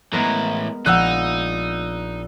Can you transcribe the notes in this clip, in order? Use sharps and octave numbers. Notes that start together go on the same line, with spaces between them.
A2 E3 G#3 B3 A#4
A#1 D#4 F#5 E6 F#6